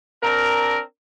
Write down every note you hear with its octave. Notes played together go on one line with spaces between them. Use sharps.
C4 D4 A#4